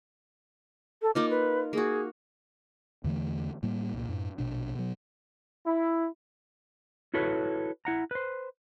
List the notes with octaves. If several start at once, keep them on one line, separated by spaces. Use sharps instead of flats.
A4
A#3 D#4 F4 D6
B4
A#3 F#4 G#4
E2 D3 E3 A3
A2 G3 A#3
C2 A#2
F#2 A2
A#1 B2 D4
B2 F#3
E4
E4 F#4 A4 B4 C#5
E4 F#5 A#5
B4 C5